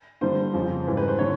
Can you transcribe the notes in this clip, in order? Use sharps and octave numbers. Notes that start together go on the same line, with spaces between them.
G2 D3 G3 C5
F2 C#3 F3
G#2 E3 G3
B4
C5
D3 C#5